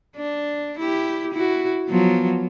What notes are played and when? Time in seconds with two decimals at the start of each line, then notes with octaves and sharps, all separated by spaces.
0.16 D4
0.79 E4 G4
1.34 E4 F#4
1.89 F3 F#3 B3